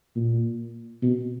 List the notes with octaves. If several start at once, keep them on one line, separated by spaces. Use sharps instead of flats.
A#2
B2